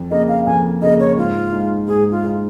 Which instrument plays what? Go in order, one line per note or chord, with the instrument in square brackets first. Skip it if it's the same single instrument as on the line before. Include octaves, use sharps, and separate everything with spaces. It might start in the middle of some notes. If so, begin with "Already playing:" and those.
Already playing: [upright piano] F2
[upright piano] C#3 A#3 [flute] D#5
[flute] F5
[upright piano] F2 [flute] G#5
[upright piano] C#3 A#3 [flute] D#5
[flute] C#5
[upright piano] G#2 [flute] F4
[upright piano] G#3 D#4
[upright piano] G#2 [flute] G#4
[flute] F4
[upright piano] G#3 D#4